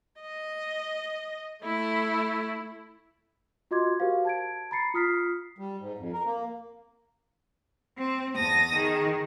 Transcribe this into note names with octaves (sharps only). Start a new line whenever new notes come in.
D#5
A3 E4
F4 F#4 D#5 C6 D6 G#6
F#4 G4 A#4 C5 F5
A5 G#6 D7
A#5 B5 A6 C7 C#7
F4 D#6 F6 B6 C7
G3
G#2
F2
A#4
A#3
C4
E2 A5 D#6 A#6
D#3 G#4